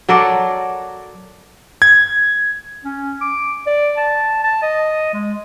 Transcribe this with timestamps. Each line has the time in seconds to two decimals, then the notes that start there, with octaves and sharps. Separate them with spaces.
0.09 F#3 A4 A#4 D5
1.82 G#6
2.85 C#4
3.21 D6
3.67 D5
3.97 A5
4.44 A5
4.63 D#5
5.14 G#3